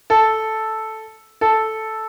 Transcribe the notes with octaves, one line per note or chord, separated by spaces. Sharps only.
A4
A4